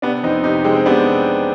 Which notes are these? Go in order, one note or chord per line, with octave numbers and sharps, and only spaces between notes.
C3 B3 D4
F2 C4 D#4
C3 D#4 G4
C3 G#3 C4
C4
C3 B3 D4